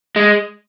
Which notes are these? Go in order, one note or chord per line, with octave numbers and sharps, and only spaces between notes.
G#3